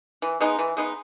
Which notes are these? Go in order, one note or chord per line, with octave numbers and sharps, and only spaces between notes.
E3
G#3 B3 D#4
E3
G#3 B3 D#4